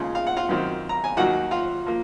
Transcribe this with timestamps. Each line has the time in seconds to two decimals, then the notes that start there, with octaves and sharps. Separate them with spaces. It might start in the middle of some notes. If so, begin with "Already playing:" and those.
Already playing: D#2 C#3 G#3 F4 F5
0.15 F5
0.27 F#5
0.37 F4 F5
0.49 F#2 D#3 F#3 C4
0.89 A#5
1.04 G#5
1.17 D#2 D#3 F#3 F#4 F#5
1.51 F4 F5
1.87 F3 A#3